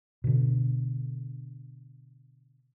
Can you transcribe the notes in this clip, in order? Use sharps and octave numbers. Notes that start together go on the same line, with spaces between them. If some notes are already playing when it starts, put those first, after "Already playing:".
B2 D3